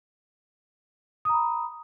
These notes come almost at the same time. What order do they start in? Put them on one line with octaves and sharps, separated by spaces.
D#6 A#5 B5